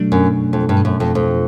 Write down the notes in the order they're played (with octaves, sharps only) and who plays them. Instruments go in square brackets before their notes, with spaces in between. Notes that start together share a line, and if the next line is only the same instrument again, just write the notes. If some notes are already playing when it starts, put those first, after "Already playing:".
Already playing: [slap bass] B2 F#3 A3 D4
[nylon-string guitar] F#2
F2
G2
F#2
F2
F2